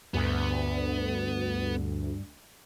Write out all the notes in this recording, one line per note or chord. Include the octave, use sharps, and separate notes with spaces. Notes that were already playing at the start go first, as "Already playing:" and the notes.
D2 G2 B3